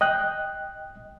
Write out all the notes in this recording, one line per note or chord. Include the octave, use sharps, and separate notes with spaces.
D#5 G5 F#6